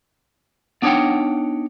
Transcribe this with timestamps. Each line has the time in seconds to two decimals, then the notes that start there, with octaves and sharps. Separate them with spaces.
0.82 B3 D4 D#4 C#5 F#5 G5